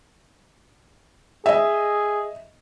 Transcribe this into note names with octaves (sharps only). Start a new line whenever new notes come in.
G#4 D#5 E5